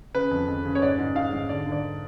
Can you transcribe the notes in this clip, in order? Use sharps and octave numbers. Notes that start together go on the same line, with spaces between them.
C#3 B4
F2
F2
C#3
C#5
G#2 D5
G#2
G#2 F5
G#2
D3 D5
D3
D5